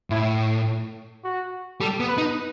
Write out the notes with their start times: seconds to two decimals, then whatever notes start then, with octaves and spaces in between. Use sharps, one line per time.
0.10 A2 E4
1.24 F#4
1.80 G3 A4
2.00 B3
2.08 B4
2.18 D#4